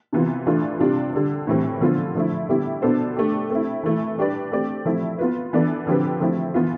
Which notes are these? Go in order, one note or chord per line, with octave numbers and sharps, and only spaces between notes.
C3 E3 B3 F4
E3 A3 D4 F4
C3 G3 D4 F4
D3 G3 D4
A2 E3 G3 C4
D3 F3 B3 F4
D3 F3 A3 E4
D3 G3 B3 E4 G4
B2 B3 D4 A4 C5
A3 D4 G4
A3 C4 E4
E3 A3 E4
G3 D4 G4 B4 D5
A3 C4 G4 D5
F3 A3 C4 E4
B3 F4 B4
E3 B3 D4 A4 D5
D3 F3 C4 G4 B4
F3 A3 C4 E4
E3 B3 F4